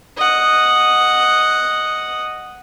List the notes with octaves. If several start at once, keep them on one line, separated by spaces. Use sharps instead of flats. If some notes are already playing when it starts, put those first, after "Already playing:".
D#5 F#5